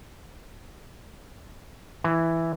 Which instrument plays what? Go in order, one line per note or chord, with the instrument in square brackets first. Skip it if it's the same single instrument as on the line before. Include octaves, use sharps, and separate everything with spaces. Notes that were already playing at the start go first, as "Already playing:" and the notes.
[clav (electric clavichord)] E3